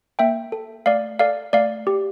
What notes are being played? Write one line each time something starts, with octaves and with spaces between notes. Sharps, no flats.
A#3 E5 G5
A4
A3 D5 F5
A4 D5 F5
A3 D5 F5
G4